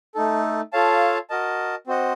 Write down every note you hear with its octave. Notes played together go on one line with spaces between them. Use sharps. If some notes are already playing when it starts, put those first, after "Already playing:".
A3 D#4 A4
F4 A4 C#5 F5 A5
F#4 A#4 D#5 A5
C4 F#4 C5 D#5 F#5